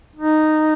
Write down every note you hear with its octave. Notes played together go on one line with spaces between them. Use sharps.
D#4